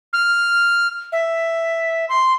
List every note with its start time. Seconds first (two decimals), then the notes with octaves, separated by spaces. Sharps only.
0.13 F6
1.12 E5
2.09 C6